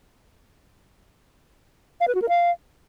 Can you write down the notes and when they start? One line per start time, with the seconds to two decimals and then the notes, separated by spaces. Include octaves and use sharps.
2.01 F5
2.08 B4
2.15 F#4
2.22 A#4
2.29 F5